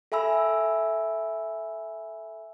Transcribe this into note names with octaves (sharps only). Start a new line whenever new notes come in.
A4 E5 G#5 B5 E6